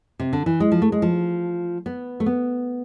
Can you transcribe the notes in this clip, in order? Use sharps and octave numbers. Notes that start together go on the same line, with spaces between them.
C3
D3
E3
G#3
F3
A3
G#3
F3
B3
A3
B3